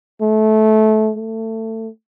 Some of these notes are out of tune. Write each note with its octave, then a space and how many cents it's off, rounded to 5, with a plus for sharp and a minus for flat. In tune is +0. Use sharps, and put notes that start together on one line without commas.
A3 -20
A3 +25